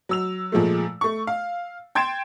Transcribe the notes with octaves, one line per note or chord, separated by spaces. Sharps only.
F#3 E6 F7
A#2 F3 G#3 A3
A3 C#6
F5
G5 C6 G#6 A6 D7 E7